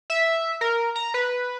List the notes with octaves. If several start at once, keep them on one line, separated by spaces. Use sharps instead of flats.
E5
A#4
A#5
B4